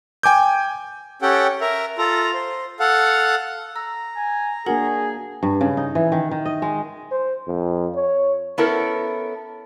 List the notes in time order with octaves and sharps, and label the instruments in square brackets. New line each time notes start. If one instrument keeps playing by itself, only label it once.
[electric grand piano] G5 G#5 D6 G6
[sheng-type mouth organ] C#4 G4 A4 F#5 G5
A#4 E5 A#5
F4 A4 A#5
C5
A4 F5 F#5
[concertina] A#5 [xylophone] E6
[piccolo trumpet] G#5
[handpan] A#3 D4 F#4 [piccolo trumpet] G#4 [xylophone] A#4 F#5 F#7
[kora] G2
C#3
D#4
E3
D#3
D#3
D#5
G#3
[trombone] C5
F2
C#5
[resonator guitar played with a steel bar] B3 C#4 E4 A4 A#4